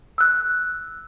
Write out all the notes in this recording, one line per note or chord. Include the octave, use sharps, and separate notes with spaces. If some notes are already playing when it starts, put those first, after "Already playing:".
E6 F#6